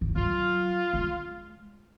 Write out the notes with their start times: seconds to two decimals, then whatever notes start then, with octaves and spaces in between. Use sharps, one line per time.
0.01 D#3
0.09 F3
0.16 F#3 F4
0.93 G#3